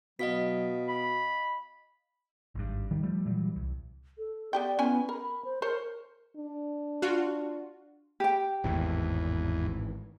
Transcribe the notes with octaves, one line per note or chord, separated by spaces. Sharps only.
B2 F#3 D#5 F5 B6
B5
G#1 G2
D#3 G3
F3 G3 A3
A#2 E3 F#3 G3
C2
A4
B3 G4 D5 G5
B3 C#4 E4 G#5
A#4 B5
C5
A#4 C5 C#5
D4
F4 F#4
G4 G5
G#1 E2 A2 E3